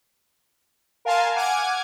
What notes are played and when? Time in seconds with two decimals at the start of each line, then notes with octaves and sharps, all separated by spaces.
1.05 A#4 F5 G#5 A5 C6
1.36 F#5 G#5 D6 F6 G#6